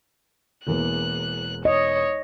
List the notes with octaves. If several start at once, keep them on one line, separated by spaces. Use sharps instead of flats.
E1 E2 A#3 F#6
C#5 D#5